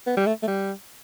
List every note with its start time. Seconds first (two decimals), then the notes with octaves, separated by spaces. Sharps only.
0.07 B3
0.17 G3
0.26 A3
0.43 A3
0.47 G3